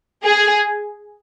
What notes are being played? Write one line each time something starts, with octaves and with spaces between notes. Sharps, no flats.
G#4